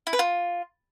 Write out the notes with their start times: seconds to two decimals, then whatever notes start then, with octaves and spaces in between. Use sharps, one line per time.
0.07 E4
0.13 B4
0.19 F4